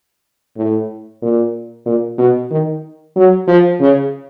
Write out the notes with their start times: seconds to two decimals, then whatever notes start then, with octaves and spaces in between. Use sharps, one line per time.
0.57 A2
1.22 A#2
1.86 A#2
2.18 B2
2.51 D#3
3.16 F#3
3.47 F3
3.80 C#3